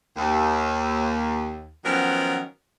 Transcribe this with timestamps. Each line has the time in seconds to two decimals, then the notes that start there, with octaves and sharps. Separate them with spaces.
0.17 D#2
1.85 D#3 F3 F#3 B3 C#4 A#4